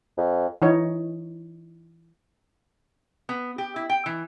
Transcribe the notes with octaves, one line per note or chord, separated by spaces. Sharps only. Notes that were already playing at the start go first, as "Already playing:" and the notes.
F2
E3 D#4 C#5
B3
G4
E4
G5
E3